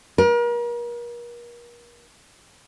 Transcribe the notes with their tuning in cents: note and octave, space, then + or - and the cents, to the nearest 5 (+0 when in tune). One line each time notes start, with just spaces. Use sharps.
A#4 +40